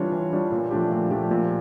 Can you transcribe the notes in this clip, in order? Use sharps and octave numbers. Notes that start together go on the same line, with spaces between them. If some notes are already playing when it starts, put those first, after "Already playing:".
Already playing: E3 G3 D4 F4 C#5
E3
G3 D4 F4 C#5
A#2
F3 A3 D4 G4
A#2
F3 A3 D4 G4
A#2